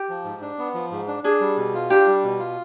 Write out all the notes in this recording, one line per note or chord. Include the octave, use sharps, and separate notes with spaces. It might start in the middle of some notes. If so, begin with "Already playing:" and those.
Already playing: G4
F3
G#2
D4
B3
F3
G#2
D4
D4 G#4
G3
B2
F4
D4 G4
G3
B2
F4